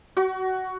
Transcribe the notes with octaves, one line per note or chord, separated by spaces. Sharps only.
F#4